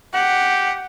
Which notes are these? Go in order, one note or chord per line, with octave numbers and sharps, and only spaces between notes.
G4 F#5